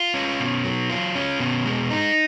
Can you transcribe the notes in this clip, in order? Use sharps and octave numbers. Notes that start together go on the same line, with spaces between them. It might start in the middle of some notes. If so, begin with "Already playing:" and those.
Already playing: F4
C#4
B2
F#3
F4
C#4
B2
G#3
D#4